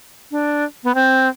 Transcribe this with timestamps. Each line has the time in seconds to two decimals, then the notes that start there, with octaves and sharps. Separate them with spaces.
0.31 D4
0.84 B3
0.95 C4